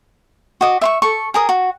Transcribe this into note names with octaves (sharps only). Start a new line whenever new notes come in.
F#4 D#5 D6
E5 C6 C#6
A4 C#6
G#4 A#4 D#6
F#4